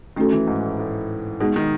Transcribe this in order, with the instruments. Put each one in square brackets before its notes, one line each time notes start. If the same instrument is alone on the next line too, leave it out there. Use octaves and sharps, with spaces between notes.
[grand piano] D#3 [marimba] A3 C#4 F#4 A4
[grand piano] E3
G#2
A2
A2
[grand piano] B2 [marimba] G#3 B3 D#4 G#4
[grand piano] D#3